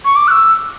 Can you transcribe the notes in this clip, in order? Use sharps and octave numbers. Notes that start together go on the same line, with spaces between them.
C#6
D6
F#6
E6